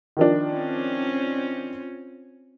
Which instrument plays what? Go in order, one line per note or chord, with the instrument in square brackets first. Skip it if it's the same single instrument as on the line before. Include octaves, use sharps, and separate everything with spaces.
[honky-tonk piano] D#3 F3 D4
[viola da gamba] C4 C#4 F4